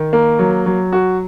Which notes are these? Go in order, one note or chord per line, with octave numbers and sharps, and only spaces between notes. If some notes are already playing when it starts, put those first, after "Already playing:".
Already playing: D#3
A#3
F#3
F#3
F#4